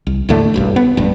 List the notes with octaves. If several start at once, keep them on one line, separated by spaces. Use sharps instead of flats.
C2
D#2 A2 D3 A3
F#1 B1 G2
B3
D1 G2